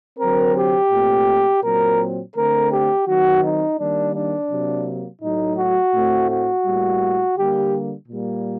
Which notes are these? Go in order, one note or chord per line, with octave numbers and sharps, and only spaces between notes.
D3 F#3 C4 A#4
G4
A#2 A3 C4
A#2 F#3 C4 A#4
D3 A3 C4 A#4
G4
D#3 F#3 C4 F#4
D#4
D#3 G3 A#3 D4
D4
C3 F#3 A#3
A2 F#3 A3 D#4
F#4
A2 A3 C4
F#4
A2 G3 A#3
D3 G3 A#3 G4
A#2 G3 A#3